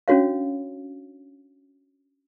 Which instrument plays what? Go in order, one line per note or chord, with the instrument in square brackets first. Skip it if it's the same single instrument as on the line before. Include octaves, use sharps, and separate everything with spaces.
[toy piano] C#4 D4 F#4 C#5 F5